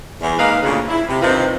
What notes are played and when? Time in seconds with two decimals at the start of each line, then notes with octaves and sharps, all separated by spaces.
0.21 E2
0.38 G#3 A#3 D#4 B4 F5
0.62 D2 A#2 C#3
0.88 E4
1.08 C3
1.21 G2 C3 D#3 F3